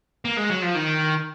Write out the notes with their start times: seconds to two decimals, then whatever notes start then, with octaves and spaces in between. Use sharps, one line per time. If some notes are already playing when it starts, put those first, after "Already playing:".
0.25 A#3
0.37 G#3
0.50 F#3
0.62 F3
0.75 D#3